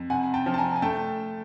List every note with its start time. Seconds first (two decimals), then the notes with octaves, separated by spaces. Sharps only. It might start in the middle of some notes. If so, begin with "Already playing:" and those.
Already playing: F2
0.10 C3 F#5 G#5
0.34 G5 A5
0.46 F3
0.54 A5
0.58 G#5 A#5
0.76 G#5
0.82 A3 G5 A5